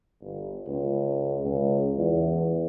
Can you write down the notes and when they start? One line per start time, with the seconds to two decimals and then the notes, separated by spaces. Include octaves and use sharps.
0.21 G1
0.67 C#2
1.44 C#2
1.98 E2